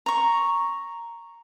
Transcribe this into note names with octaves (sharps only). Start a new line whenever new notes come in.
A#5 C#6